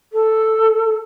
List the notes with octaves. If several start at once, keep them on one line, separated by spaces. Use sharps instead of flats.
A4